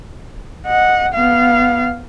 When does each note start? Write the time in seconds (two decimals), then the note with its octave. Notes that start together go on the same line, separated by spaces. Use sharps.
0.67 D#5 F#5
1.13 B3 F5